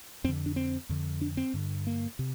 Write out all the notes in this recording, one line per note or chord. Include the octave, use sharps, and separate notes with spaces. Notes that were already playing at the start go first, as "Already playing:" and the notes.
F2 D3 C4
D4
C4
F2 D3
D4
C4
G2 D3
A#3
C3